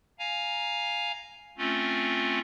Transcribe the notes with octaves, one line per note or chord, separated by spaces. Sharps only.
F5 G#5 A#5
A3 C4 C#4 F4